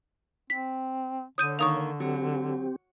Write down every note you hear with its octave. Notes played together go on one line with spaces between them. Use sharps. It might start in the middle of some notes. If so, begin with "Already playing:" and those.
C4 B6
D3 C#5 D#6 G6 D#7
D#3 A#3 C#6 D#6 F7
F#3 C4 G4